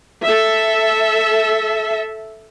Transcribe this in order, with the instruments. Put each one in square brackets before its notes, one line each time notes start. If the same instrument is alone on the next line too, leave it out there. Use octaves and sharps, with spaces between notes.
[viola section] A4 E5